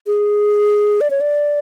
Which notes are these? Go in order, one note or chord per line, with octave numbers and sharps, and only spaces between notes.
G#4
D5
C#5
D5